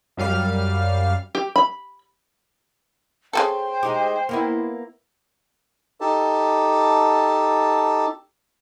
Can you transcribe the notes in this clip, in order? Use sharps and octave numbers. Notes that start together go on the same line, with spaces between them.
F#2 G3 F5 F6
G4
B5
C#3 G3 A4 C5 G5
G#3 D#4 G4
A#3 B3 E4
D#4 G4 A4 A5